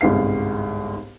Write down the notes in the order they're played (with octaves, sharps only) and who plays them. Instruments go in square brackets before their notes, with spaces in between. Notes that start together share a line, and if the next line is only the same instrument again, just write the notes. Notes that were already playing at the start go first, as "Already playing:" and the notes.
[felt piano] G1 C2 G#2 F5 C7